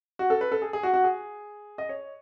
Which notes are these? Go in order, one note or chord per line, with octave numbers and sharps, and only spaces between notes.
F#4
A4
B4
A4
G#4
G#4
F#4
F#4
G#4
D#5
C#5